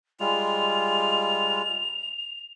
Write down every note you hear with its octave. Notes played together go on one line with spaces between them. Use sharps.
G3 G#3 F4 F7